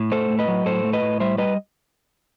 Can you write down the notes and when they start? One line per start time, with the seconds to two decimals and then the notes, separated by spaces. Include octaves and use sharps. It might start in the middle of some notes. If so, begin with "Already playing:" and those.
Already playing: A2
0.12 A3 A4 C5
0.30 A2
0.39 B4 D#5
0.48 F#3
0.66 A2 A4 C5
0.84 A3
0.93 B4 D#5
1.02 A2
1.20 G3 C5 E5
1.38 G3 B4 D#5